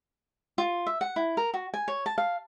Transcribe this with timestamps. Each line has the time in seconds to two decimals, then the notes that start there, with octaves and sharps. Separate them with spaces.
0.58 F4
0.86 E5
1.01 F#5
1.16 E4
1.37 A#4
1.54 F#4
1.74 G#5
1.88 C#5
2.06 A5
2.18 F5